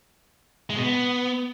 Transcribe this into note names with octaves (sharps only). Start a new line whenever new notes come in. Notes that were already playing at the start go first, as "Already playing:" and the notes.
G#3
B2
B3